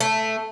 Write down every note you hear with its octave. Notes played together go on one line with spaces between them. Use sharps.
A3